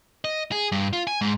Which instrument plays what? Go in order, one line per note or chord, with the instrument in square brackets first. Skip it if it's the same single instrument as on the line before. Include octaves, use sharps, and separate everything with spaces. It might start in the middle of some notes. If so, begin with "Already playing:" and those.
[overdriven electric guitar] D#5
G#4
G2
F4
G#5
G#2